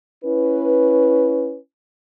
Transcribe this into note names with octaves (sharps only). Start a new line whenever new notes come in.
C#4 E4 B4